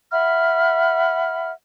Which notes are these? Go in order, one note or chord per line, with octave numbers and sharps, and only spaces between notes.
E5 F#5 B5 F6